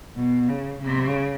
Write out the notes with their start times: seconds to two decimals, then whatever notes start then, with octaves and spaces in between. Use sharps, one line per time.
0.16 B2
0.49 C#3
0.82 C#3